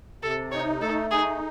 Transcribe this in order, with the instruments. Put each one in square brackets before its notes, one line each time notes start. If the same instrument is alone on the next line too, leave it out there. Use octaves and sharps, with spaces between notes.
[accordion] C3 [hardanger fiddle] A4
[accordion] D#4 [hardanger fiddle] C#5
[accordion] A3 [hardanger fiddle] A4
[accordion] D#4 [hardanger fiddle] G#4